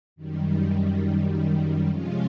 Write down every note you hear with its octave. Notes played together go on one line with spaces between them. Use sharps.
F#2 D#3 G3
C3 F3 G#3 C#4 F4